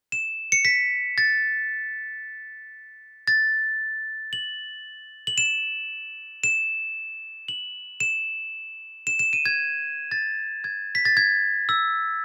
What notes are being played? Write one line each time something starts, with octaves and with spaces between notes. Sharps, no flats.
E7
C#7
B6
A6
A6
F#7
F#7
E7
E7
F#7
E7
E7
E7
D#7
G#6
A6
G#6
B6
A6
G#6
E6